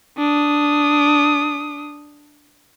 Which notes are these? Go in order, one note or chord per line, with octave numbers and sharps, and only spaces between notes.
D4 D#6